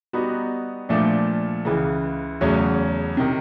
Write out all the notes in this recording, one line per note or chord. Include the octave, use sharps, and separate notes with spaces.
G3 B3 D#4 F#4
A#2 F3 A3 D4
C#2 C#3 E3
E2 C#3 F#3 A3 C#4
C3 D#3